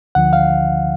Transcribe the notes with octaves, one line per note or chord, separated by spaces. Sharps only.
D2 D3 F3 F#5
F5